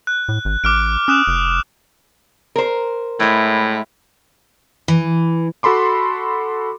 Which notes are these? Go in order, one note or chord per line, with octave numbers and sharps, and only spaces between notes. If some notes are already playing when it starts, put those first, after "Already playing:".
F#6
A2
G#1
A1 D6 F6 D7
C#4 D#6 F#6 E7
F1
A#4 C5
A2 G#3 E4
E3
F#4 A4 B5 C6 D6